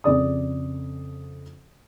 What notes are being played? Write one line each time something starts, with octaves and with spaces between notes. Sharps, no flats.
F2 C#3 D5 D#6